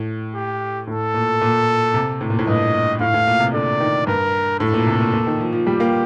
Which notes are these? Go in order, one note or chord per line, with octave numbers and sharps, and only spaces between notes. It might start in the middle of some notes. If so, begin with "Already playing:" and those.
Already playing: A2
G4
A2 A4
A#2
A#2
C3
A2
A#2
A2
G2 D#5
A2 F5
A2
A#2
C3
D3 D5
D#3
G2 A#4
A2 A4
A#2
C3
A#2
A#2
D#3
F3
F3
G3 G4
A#3